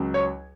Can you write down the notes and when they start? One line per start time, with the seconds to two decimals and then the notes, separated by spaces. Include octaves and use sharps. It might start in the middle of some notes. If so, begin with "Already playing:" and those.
Already playing: C#2 F#3
0.14 C#5